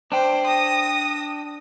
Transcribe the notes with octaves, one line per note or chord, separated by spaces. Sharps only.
D4 C5 G5
D#6 A#6